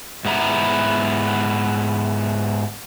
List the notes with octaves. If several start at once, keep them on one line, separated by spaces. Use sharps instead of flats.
G#2 B3 E4 A#5